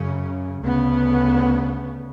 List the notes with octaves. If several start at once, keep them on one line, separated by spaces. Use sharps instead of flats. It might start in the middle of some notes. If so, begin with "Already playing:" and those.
Already playing: F#2 C#3 C#4
D2 C#3 B3